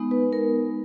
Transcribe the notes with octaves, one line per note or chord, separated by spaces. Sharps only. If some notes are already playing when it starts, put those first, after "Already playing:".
Already playing: G#3 B3 D#4
B4
A#4